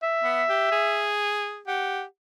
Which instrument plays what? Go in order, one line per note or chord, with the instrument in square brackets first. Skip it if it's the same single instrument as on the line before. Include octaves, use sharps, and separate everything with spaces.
[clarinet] E5
[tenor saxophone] B3
G4
G#4
[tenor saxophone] G4 [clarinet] F#5